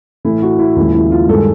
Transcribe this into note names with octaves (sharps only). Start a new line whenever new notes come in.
A2 E3 A3 E4
F#4
E4
D#2 C#3 F3 G#3 E4
E4
F4
G2 D#3 G#3 A4